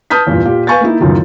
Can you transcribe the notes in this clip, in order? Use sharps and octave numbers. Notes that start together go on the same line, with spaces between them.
B4 A5 D#6 F6 G6 B6
E2 G2 A#2
A#2 G4 F5
B4 F5 G#5 C#6 G6 A6
A#3 D#4 E4
C#2 F#2 A2 D#3 E3